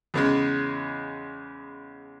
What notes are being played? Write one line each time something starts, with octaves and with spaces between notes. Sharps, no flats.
E2 C#3 G#3